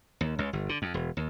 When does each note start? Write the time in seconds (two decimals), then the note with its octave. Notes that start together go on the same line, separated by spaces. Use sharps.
0.21 D#2
0.39 C#2
0.53 G1
0.69 D3
0.82 F2
0.94 E1
1.17 D#2